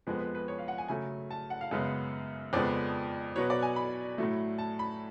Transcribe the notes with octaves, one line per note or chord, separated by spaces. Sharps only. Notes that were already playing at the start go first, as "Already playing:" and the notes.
F2 F3 G#3 B3 B4
B4
B4
C#5
F5
F#5
G#5
C#3 F#3 A3 G#5
A5
F#5
F5
F#2 C#3 G#3 B3
F2 C#3 F3 G#3 B3 D5
B2 F#3 B3 C#5
D5
G#5
B5
A2 F#3 A3
A5
B5